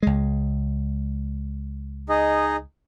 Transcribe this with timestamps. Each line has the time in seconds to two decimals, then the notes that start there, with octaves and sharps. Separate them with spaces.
0.03 C#2 G#3
2.09 D#4 G#4 D#5